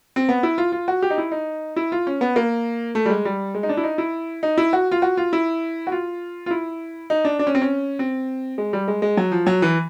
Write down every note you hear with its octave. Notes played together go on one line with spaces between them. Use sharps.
C4
B3
E4
F4
F4
F#4
G4
D#4
E4
D#4
E4
F4
C#4
B3
A#3
A3
G3
G#3
G3
G#3
D#4
D4
E4
D#4
E4
D#4
E4
F#4
F4
F#4
F4
E4
F#4
F4
F4
E4
D#4
D4
D4
C#4
C4
C#4
C4
G#3
G3
G#3
G#3
F#3
F3
F#3
E3